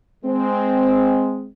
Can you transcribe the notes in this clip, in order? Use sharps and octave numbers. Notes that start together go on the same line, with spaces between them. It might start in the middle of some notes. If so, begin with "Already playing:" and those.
G#3 C4